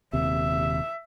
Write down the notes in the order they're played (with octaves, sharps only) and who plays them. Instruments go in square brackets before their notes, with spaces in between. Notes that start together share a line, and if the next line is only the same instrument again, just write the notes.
[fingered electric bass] D#1 D#2 C3 [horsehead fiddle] E5